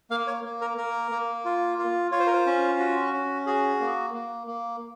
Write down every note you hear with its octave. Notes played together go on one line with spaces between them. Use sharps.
A#3 F5
C#5
A#3
A#4
A#3 A#4
A#3
F4
F4
F4 C#5
C5
A#4
C5
C#4
F#4
C#4
F#4 G#4
A#3
A#3
A#3